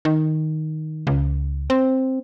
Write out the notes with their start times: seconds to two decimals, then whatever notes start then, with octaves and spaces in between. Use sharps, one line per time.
0.05 D#3
1.07 C#2
1.70 C4